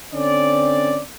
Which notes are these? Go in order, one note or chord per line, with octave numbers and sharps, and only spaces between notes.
D3 C4 C#4 D5